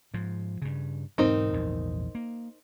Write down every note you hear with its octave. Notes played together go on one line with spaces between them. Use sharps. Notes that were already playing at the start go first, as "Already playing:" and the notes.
G#2 F3
G2 C#3
E1 G#2 F#3 C4 D#4 A#4
A#1 E2 G#2
A#3